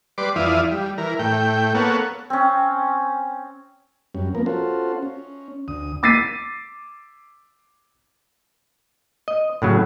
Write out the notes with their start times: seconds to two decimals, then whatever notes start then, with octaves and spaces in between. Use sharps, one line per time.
0.18 G3 B4 D5 C6 D6
0.36 F2 E3 E4 D5 F5 D#6
0.71 G3
0.98 E3 A#4
1.19 A2 G5
1.75 A#3 B3 A4 C#5 F#5
2.30 C4 C#4
4.15 F#2 G3 C#4
4.35 F3 A#3 B3 A#4
4.46 C#4 F4 F#4 A4 C5
5.03 C#4
5.68 D2 D#6
6.03 D6 E6 A6 B6 C7 D#7
9.28 D#5
9.62 A2 C#3 F#3